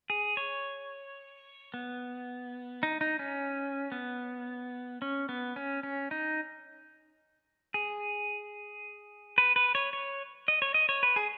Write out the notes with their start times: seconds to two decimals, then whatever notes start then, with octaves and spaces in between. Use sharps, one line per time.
0.10 G#4
0.37 C#5
1.74 B3
2.83 D#4
3.01 D#4
3.19 C#4
3.92 B3
5.02 C#4
5.29 B3
5.56 C#4
5.83 C#4
6.11 D#4
7.74 G#4
9.38 B4
9.56 B4
9.75 C#5
9.93 C#5
10.48 D#5
10.62 C#5
10.74 D#5
10.89 C#5
11.03 B4
11.16 G#4